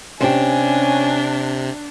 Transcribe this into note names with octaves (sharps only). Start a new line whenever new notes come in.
C3 C#4 D4 G4 C5 G#5